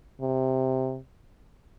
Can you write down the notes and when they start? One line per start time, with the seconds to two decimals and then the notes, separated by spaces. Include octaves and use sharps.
0.21 C3